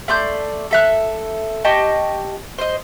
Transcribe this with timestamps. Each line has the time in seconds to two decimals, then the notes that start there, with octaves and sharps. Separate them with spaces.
0.08 A3 D5 C6 G6
0.71 A4 E5 F#6
1.64 G4 D#5 A5 C#6
2.58 C5 D#5